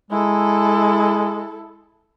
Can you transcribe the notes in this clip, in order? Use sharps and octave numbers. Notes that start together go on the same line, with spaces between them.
G#3 E4 A4